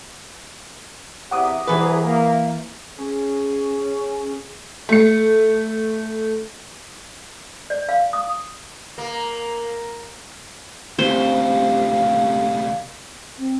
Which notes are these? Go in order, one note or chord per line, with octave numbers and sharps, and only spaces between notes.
E2 C3 E5 F#5 A#5 D6 D#6
C2 E3 G#4 B4
A#3
C#4 G#4
A3 C#7
D5
F5
D#6
A#3
D2 C3 G4 C5 F5
C4